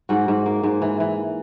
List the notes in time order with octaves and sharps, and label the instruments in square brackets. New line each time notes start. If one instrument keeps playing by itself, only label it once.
[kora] G#2 F#4
G#2
A#3
G#2
E3
E3